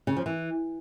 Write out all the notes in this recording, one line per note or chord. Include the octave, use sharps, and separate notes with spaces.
C#3
F3
E3